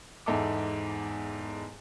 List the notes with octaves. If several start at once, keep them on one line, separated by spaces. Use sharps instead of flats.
E2 G#2 D#4 A4 E5 D6